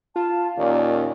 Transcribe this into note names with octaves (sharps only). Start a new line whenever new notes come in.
F4 A5
D#2 A#2 C#4 D5